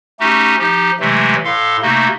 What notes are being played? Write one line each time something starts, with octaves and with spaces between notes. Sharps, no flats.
A3 C#4 D#4 F#4 G4
F3 D#4 G4
C3 E3 F#3 G#3 A3
A2 A4 F5 C6
C3 A3 A#3 D#4 F#4